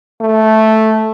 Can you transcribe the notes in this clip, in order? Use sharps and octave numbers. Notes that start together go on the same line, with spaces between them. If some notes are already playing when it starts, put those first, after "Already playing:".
A3